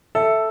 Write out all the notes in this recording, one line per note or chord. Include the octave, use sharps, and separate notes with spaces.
A4 E5